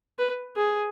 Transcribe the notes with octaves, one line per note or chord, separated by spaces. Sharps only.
B4
G#4